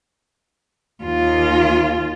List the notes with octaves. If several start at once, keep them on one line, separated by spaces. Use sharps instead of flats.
D#2 F4